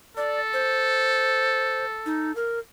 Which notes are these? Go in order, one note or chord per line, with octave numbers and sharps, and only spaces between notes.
A4 D5
C5
D#4
A#4